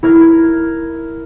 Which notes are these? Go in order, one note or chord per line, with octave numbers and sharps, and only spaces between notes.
E4 A#4 G#6